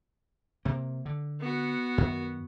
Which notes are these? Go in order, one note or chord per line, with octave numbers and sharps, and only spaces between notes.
C3 A#3
D3
B3 F#4
F#2 D#3